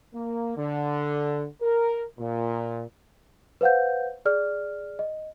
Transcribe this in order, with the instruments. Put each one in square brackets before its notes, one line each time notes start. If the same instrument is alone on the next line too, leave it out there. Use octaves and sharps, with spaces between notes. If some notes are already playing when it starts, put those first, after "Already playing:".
[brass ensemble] A#3
D3
A#4
A#2
[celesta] B4 C5 F5 F#5 G6
G#4 D5 F6
D#5